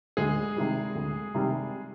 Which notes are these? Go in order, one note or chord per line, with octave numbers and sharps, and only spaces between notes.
D2 G#3 G#4
C3 D#3 G3
D2
C3 D#3 G3